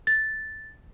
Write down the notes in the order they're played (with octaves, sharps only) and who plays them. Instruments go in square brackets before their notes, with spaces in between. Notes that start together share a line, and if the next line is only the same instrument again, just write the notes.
[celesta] A6